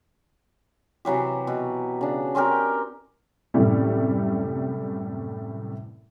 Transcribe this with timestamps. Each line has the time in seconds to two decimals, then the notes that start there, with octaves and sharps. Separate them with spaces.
1.05 C3 E3 F#3 G4
1.47 B2
2.01 C#3 D4
2.35 C4 C#4 G4 A#4
3.54 F#2 A2 C3 E3 G3 A3